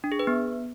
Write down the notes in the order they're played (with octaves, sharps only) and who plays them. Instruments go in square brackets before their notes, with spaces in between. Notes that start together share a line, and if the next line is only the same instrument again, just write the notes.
[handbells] D4
G#4
B4
B3